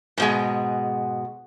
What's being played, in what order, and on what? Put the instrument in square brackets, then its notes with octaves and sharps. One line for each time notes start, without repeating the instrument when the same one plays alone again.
[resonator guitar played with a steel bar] G#2 B2 G#3